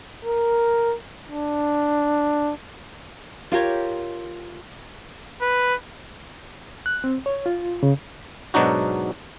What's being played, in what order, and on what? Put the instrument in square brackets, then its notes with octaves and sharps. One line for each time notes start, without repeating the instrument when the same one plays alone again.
[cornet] A#4
D4
[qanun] F4 G4 A#4 C#5
[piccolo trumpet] B4
[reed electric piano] F#6
C4
C#5
F4
C#3
[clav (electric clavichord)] G#2 B2 F#3 D4 D#4 F#4